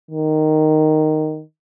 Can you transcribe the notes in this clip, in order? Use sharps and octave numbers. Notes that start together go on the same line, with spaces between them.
D#3